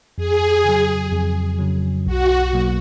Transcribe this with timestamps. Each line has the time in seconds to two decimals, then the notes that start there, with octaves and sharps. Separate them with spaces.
0.17 F2 G#4
0.65 C#3 F#3
1.12 F2
1.59 C#3 F#3
2.06 B1 F#4
2.53 B2 F#3 A#3